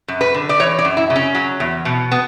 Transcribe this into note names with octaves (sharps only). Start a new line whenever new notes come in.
F#2
B4
D3
D5
E3 C#5
D5
F#2
E4
C#3
C#4
F#3
E2
B2
B3